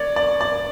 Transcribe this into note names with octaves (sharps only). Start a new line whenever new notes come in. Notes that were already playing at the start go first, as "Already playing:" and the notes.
Already playing: C#5 D5
D5
D5